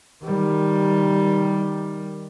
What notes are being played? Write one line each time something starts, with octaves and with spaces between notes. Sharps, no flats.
D#3 G3